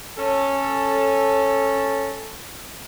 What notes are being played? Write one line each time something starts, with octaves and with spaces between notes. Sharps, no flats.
C#4 A4